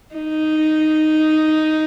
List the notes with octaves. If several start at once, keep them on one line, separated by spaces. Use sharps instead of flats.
D#4